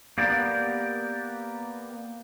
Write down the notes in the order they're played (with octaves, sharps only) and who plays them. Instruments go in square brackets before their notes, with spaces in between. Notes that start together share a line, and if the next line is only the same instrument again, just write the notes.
[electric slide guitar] A#3 B3 G4 A#4 D5